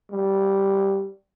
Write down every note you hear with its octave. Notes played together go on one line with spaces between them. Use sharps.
G3